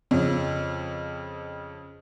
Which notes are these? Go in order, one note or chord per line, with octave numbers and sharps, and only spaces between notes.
F2 C#3